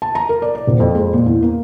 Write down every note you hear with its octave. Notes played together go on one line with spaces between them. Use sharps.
A5
A#5
A#4
D5
D5
D#1
F2
G#3
A#2
E2
A#3